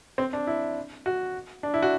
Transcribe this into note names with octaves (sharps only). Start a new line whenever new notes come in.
C4
D4
E4
F#4
D4
E4
F#4